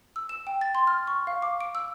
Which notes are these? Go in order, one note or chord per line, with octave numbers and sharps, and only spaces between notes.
E6
E7
G5
A6
C6
F6
C#6
F5
D6
D7
E6